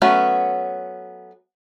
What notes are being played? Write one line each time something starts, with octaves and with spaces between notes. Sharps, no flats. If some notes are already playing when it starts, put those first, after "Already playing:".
F#3 A3 B3 C#4 F#4